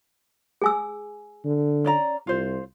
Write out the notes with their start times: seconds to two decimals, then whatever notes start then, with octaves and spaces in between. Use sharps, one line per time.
0.62 G#4 G#5 E6
1.45 D3
1.84 C#4 D5 A#5
2.27 C2 F4 C5